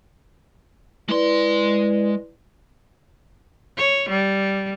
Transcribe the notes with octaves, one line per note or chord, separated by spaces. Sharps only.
G#3 E4 B4 D5 C6
C#5
G3